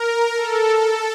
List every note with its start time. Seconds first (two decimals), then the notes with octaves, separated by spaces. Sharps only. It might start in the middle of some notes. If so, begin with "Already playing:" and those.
Already playing: A#4
0.35 A4